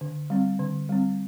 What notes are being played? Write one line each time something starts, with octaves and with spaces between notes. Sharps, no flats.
D3
G3 C4
D3
G3 C4